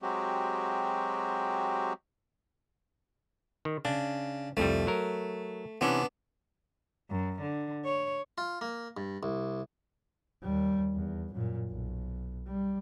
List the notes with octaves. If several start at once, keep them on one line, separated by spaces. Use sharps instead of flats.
F#3 G#3 C4 F#4 G4
D#3
C#3 D4
C2 F2 G3 A3
F#3 A#4
C3 E3 B3 C#4 D4
F#2
D3
C#5
F4
A#3
G2
C2
D#2 G3
E2
F#2 A#2
B1
G3